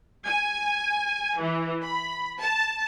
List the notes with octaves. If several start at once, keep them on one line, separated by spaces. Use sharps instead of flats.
G#5
E3
B5
A5